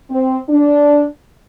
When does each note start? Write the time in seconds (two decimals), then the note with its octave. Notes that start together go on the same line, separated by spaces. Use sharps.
0.10 C4
0.49 D4